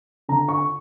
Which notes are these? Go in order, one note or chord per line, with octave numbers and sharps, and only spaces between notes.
D3 A#5
C#6